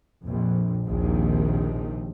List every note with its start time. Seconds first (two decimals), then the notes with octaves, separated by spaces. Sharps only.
0.22 A#1 F2
0.85 A#1 D#2 C3 D#3